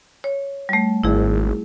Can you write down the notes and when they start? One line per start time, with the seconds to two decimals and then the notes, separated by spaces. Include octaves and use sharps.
0.24 C#5
0.69 G3 A3
1.04 G#1 E4 G#4